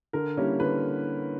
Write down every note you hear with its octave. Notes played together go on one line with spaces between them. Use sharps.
D3 A#4
G3 A#3 C#4 E4
D3 B4